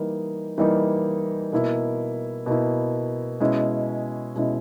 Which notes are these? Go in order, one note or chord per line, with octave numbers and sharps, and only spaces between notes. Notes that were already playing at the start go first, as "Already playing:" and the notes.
Already playing: E3 G3 A#3 D#4
E3 G3 A#3 D#4
B2 A#3 E4
B2 A#3 E4
B2 G#3 C#4 E4
B2 G#3 C#4 E4